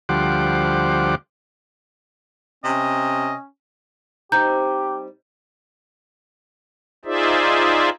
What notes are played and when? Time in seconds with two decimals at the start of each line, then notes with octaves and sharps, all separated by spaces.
0.09 D2 F3 G3 C5 F#5 D6
2.64 C3 C#4 D#5
4.32 G3 C4 D#4 G4 A#5 G6
7.05 D#4 F4 G#4 C5 D5 E5